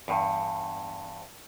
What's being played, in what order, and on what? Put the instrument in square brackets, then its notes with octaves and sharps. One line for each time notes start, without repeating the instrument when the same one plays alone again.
[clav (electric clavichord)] E2 G2